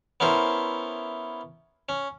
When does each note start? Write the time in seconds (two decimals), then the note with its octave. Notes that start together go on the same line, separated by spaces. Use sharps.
0.20 B3 C#4 E4 A#4 C5
1.89 C#4